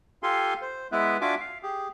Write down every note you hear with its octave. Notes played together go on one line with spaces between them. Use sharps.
F4 G4 A4 F5 G#5 C6
C5
G#3 B3 E4 B4 E5
D4 F4 F#4 E5 G#5 D6
F5
G4 G#4